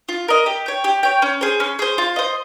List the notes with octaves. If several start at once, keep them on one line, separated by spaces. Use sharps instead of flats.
F4
A#4 D#5
G4
C#5 G5
G4
C#5 G5
C#4
G#4 C5
C#4
G#4 C5
F4
C5 D#5